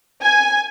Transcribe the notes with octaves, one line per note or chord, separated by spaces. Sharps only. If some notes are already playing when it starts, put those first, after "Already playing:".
G#5